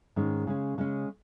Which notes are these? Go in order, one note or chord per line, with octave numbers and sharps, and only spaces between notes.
G#2 D#3 G#3 C#4
C#3 G#3 C#4
C#3 G#3 C#4